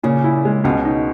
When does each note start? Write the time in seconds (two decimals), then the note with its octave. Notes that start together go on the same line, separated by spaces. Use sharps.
0.03 A#2 C#3
0.24 E4
0.45 G#3
0.64 C#2 B2
0.85 D#4